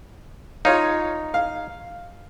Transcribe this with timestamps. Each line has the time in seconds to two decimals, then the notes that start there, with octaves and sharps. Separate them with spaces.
0.65 D#4 F4 C#5 F5
1.34 F5